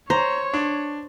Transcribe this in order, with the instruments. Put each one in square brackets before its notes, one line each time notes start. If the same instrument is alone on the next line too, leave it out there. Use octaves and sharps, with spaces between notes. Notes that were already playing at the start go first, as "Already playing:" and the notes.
[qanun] C5 [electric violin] C#5 [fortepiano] A#5
[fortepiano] D4